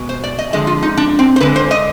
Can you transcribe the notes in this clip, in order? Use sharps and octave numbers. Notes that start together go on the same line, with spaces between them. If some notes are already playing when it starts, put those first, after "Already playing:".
Already playing: B2 G#3
C5
D5
D#5
D3 F3 G#3 D#5
F4
D#4
D4
C4
C5
D3 G#3 B4
C5
D#5